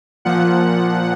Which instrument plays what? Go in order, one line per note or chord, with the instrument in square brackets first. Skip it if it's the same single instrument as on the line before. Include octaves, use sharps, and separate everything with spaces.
[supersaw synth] A#2 F3 F#5